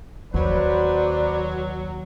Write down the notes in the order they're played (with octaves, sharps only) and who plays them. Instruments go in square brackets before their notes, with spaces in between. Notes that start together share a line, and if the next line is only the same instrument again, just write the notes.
[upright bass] D#2 A#3 [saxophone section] F#3 [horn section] B4 C5 [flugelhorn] D5